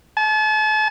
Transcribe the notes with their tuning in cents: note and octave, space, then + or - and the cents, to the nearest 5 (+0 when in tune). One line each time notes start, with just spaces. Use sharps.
A5 -40